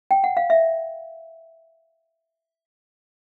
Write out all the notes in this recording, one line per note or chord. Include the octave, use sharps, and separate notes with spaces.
G5
F#5
F5
E5